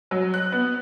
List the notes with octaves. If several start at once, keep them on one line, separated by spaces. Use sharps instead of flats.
F#3
F#6
B3